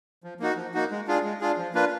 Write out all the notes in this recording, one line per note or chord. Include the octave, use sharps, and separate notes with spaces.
F3
A#3 D#4 F#4
F3
A#3 D#4 F#4
G#3
D4 F4 G#4
G#3
D4 F4 G#4
F3
A#3 D4 F4 B4